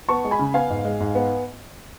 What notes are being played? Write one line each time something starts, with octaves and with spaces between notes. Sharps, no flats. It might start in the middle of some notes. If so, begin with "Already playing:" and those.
B3 A5 C#6
G#3
G#5 B5
C#3
B3 F5 G#5
G#2
G#3
G#2
B3